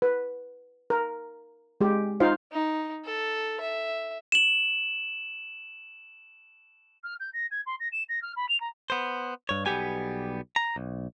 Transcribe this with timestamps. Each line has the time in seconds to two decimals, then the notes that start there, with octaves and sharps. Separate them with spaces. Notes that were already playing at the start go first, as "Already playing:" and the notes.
0.02 B4
0.90 A#4
1.81 G#3 G4
2.20 D#4 F4 C5 F5
2.52 D#4
3.05 A4
3.60 E5
4.32 E7 F#7
7.04 F6
7.20 G6
7.33 A#6
7.51 G#6
7.66 C6
7.80 A#6
7.92 E7
8.09 A#6
8.22 F6
8.36 B5
8.48 F7
8.60 A#5
8.90 B3 C5
9.49 G2 C#5
9.66 B1 G3 B3 G4 G#5
10.56 A#5
10.76 B1